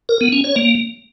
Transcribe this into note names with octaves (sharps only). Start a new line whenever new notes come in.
A#4
B3
C#4
C#5
A#3